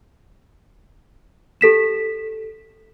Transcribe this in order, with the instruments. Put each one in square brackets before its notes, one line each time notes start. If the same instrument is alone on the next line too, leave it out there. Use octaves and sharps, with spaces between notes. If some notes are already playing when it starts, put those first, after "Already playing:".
[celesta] G4 A4 B6 E7